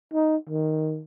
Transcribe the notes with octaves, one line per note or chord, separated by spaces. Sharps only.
D#4
D#3